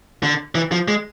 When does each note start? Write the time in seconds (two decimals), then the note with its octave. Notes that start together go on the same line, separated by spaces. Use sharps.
0.23 D3
0.55 E3
0.72 F3
0.88 G#3